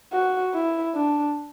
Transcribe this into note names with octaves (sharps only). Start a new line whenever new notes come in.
F#4
E4
D4